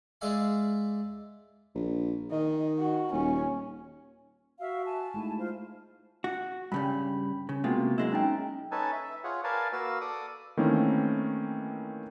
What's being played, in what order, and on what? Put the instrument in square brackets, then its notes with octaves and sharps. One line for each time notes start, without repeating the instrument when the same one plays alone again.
[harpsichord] G#3 G#4 D5 E5 F5 G#5
[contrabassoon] A#1
[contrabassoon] D#3 [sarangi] D#5
[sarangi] F#4
[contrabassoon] D#1 [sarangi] C#4
[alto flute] F#4 [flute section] E5 F5 E6
[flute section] G#5 A5
[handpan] G#3 A3 D#4 [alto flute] E4
[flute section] F4 C5
[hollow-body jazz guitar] F#4
[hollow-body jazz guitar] G2 C#3 G3 [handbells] B5
[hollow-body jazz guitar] C#3
[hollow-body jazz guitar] C3 G#3 F4 [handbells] A#3 B3 F#4
[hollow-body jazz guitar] F#2 G#3 E4
[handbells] C#4 D#4 G5
[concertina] C#4 D#4 A4 B4 G#5 A5
E5
F4 G#4 C#5 F#5
A#4 B4 D5 F5 G#5 A5
A#3 F#4 B4 F5 E6
A4 D5 D6 D#6
[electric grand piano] D#3 E3 A3 A#3 C4 C#4